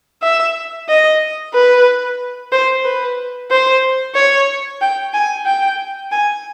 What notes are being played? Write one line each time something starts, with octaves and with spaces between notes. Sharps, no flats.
E5
D#5
B4
C5
B4
C5
C#5
G5
G#5
G5
G#5